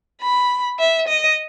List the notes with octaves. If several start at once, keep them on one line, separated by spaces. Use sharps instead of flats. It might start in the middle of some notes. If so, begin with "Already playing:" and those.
B5
E5
D#5